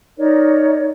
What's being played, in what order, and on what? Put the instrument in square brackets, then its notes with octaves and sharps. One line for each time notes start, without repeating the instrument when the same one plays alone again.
[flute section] D#4 A#4 C#5 D5